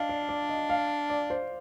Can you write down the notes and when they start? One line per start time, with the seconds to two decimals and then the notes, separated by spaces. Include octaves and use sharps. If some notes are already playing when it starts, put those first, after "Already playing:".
Already playing: D4 D#5 F5
0.09 D5
0.29 D5
0.50 D#5
0.70 F5
1.10 D5
1.30 C5